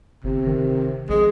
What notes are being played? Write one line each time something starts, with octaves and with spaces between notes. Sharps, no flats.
G1 C3
D#3
A#1 G#3